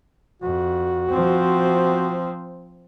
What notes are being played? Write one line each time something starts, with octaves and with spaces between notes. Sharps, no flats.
F2 F#4
F3 C4